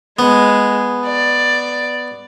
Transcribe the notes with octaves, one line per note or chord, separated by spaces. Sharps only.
G#3 B3
D5